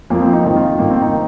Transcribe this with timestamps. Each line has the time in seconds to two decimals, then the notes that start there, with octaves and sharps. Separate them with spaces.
0.10 F2 F3 A#3
0.22 C4
0.33 D#4
0.45 F2 D#3 D#4
0.56 F4
0.79 G2 D#3 A#3
0.90 C4
1.02 D#4
1.13 D#3